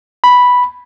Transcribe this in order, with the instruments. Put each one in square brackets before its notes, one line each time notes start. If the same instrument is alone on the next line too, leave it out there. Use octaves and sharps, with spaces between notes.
[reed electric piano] B5